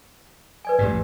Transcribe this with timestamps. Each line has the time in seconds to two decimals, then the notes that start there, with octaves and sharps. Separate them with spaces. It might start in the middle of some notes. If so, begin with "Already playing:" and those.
0.65 B4 D5 G#5
0.79 A1 F2 G#2 G4 D5